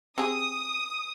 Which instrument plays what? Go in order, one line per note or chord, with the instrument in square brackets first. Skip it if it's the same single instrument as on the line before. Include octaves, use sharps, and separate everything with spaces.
[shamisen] C4 G4 G#4 [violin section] D#6